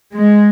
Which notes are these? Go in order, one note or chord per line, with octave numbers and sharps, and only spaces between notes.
G#3